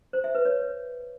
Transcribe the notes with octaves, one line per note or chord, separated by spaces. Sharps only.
C5
E5
B4
C#5